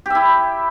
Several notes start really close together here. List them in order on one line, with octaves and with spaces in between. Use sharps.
G4 E5 E4